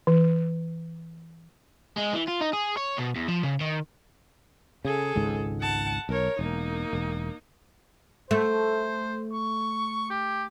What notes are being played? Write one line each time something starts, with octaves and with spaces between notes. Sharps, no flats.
E3
G#3
E3
F4
D#4
G#4
C#5
B2
E2
F3
C#3
D#3
C#3 G#4 A4
G#1 C#2 G#2
F#5 A5
B1 A#4 C#5
E1 A#3 D#4
E1
A3 C5
C#6
G4